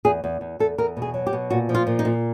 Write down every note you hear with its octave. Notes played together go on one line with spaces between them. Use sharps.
E2 G#4
E2
E2
E2 A4
E2 A#4
B2
G#4
F#3
G4
B2
A#2 F#4
F3
F4
A#2
D#4
A#2